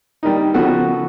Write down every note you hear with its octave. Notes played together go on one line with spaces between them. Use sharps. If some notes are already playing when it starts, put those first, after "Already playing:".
D#3 G3 A#3 D#4
C#3 F3 B3 F#4 A4